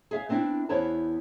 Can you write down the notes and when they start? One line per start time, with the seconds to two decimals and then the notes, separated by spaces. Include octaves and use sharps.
0.11 G#4 E5 F5
0.29 B3 C4 D4 E4 F4
0.69 E2 B3 E4 C5 C#5 A5